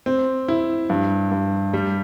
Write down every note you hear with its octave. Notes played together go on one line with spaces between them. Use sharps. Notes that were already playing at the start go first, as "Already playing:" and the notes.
C4
E4
G2
G2
G3